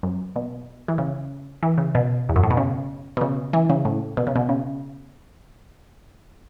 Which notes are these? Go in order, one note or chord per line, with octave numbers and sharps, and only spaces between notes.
F#2
B2
E3
C#3
E3
C#3
B2
E2
F#2
A2
B2
C#3
B2
C#3
E3
C#3
A2
B2
C#3
B2
C#3